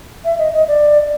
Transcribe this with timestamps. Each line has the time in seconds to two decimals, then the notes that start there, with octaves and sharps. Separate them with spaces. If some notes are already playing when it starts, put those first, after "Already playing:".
0.25 E5
0.39 D#5
0.53 D#5
0.68 D5